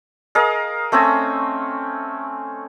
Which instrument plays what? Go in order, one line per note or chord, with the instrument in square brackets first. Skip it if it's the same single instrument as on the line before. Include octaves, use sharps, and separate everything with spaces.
[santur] G#4 A#4 D#5 F5
A3 C4 C#4 G#5